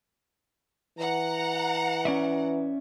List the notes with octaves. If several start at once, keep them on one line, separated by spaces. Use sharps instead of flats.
E3 F#5 A#5
C#4 D5 E5